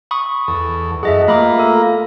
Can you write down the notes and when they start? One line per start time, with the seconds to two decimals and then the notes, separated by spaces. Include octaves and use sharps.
0.11 B5 C#6 D#6
0.48 E2 A4
1.03 F#2 G#4 A4 D#5 E5 F#5
1.28 A3 A#3 F4 A#5 B5 D6
1.59 A4